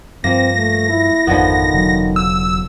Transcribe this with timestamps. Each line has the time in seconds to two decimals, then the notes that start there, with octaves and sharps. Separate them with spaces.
0.24 G2 F3 A#3 C4 A#6
0.56 A3
0.89 E4
1.27 G#1 F2 D3 D#3 F3 B3
1.74 E1 C#3 F#3
2.16 E6